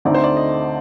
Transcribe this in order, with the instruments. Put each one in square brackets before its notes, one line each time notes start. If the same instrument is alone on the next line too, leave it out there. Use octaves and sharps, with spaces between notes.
[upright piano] D2 D3 A3 C4 D#4 [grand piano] D5
[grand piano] C5
D5
D#5